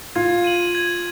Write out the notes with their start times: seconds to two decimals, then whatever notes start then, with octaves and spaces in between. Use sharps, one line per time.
0.15 F4 G#6
0.44 D#7 F#7
0.75 G#6